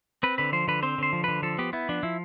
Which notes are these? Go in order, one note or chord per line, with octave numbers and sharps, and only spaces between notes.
C4 B4
D3 B4
F3 C5
D3 B4
C4 C5
D3 C5
F3
D3 B4
F3 A4
B3 G4
B3 E4
F3 D4
F3 E4